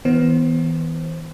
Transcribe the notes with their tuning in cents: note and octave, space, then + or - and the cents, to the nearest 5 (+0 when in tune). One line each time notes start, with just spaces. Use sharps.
E3 -30 B3 +0 C5 +15